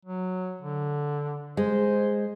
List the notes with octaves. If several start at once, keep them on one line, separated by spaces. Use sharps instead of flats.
F#3
D3
G#3 C5